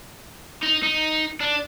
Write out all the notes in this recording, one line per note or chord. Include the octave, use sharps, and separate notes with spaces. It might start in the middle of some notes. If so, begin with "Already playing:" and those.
D#4
D#4
D4